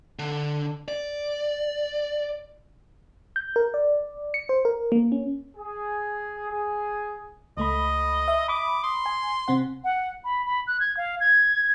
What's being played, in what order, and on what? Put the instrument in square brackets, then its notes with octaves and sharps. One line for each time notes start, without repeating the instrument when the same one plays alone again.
[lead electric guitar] D3
D5
[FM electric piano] G6
A#4
D5
C#7
C5
A#4
A#3
C#4
[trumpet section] G#4
G#4
[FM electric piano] C#2 A3 B5 [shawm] D#5
[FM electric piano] E5
[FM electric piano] B5 D#6 [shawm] D6
[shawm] C6
[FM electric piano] G#5
C3 C4 F#5
[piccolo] F#5
B5
B5
F#6
G#6
F5
G#6